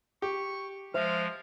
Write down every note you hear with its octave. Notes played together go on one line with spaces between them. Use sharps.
G4 C#6
F3 G#3 C5 E5 F5